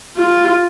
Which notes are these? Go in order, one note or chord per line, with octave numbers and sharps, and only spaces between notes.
F4